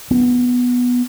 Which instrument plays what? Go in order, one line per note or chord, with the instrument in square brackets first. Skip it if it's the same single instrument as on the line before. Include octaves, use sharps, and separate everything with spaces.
[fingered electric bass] B3